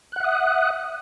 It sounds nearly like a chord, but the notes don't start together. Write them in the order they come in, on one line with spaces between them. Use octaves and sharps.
F#6 F#5 E5 D#6